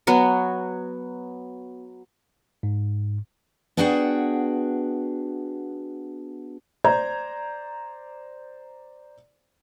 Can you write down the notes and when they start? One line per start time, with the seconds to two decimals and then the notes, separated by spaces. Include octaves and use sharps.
0.07 F#3 B3 F#4
2.63 G#2
3.77 B3 D4 F#4 G#4 F#5 G5
6.84 C5 D5 A#5 G6 G#6